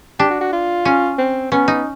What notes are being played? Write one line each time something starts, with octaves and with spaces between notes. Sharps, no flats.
D4 G4
F#4
F#4
F4
C#4
C4
B3 C#4
D#4